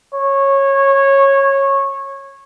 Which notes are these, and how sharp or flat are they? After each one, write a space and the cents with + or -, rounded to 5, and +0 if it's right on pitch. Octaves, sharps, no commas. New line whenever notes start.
C#5 -15